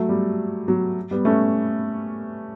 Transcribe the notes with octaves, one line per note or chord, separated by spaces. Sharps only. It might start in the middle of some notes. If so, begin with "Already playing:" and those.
Already playing: F#3 A3
G3
F#3
G3 B3
A3 C#4